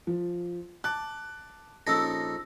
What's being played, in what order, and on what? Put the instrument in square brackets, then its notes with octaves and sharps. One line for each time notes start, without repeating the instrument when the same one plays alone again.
[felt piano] F3
[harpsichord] A5 D6 [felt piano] F#6
[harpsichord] A#1 D#4 A4 [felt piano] C#4 [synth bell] E6 A#6